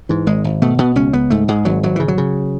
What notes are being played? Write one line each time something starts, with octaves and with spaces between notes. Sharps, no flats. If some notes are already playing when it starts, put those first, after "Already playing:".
G#2 E3
G#1 G#3
G#1
B2 A3
B2 B3
C#2 C#4
C#2 B3
G#2 A3
G#2 G#3
G#1 F#3
G#1 F#3
C#3 E3
F#3
C#3